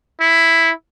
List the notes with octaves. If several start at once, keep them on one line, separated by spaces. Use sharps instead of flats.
E4